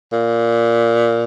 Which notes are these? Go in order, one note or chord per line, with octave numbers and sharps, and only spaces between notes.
A#2